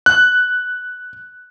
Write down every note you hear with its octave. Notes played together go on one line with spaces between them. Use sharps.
F#6